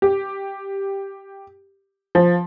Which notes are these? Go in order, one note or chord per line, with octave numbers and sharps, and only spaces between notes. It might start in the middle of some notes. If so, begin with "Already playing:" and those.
G4
F3